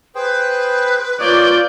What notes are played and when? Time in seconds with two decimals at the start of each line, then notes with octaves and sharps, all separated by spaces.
0.15 G#4 B4 C5 G5
1.20 A#3 F4 C#5 D5 D#6 G6